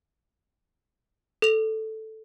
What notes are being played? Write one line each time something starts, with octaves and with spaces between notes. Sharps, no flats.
A4 F7